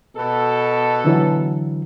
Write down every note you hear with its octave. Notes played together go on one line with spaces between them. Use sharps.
B2 A4
D3 E3 F#3